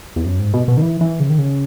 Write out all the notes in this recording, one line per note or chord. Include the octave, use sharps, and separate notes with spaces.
E2
F#2
G#2
B2
B2
D#3
E3
E3
C#3
D#3
C#3